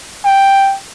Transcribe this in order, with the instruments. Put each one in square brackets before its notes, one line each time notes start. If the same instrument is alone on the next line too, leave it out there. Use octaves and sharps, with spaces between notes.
[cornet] G5